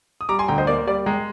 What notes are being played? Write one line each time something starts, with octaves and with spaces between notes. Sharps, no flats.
D#6
G3 A#5 D6
G#5 C6
D2 G5 A#5
C5 D#5
A#3 D5
G3 D5
G#3 G5 A#5